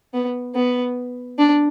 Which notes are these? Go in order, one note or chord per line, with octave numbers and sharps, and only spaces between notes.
B3
B3
D4